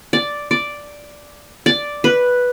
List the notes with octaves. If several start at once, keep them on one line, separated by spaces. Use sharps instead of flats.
D5
D5
D5
B4